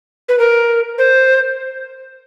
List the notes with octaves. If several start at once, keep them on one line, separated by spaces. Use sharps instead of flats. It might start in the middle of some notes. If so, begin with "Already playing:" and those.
B4
A#4
C5